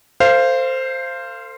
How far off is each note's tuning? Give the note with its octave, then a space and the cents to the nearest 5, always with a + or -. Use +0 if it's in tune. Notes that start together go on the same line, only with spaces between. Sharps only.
A4 +45 C5 +0 F5 -20